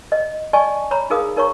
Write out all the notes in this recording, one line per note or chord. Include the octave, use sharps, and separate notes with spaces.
D#5
D5 D#5 G#5 A5 C#6
C#5 A#5 B5
D#4 G#4 A#4 F5 D#6
D#4 A#4 C#5 A#5 C#6